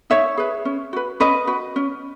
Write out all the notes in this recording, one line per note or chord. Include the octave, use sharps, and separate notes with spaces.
D#4 C#5 E5
G#4 B4
C#4
F#4 B4
C#4 B4 D#5
F#4 B4
C#4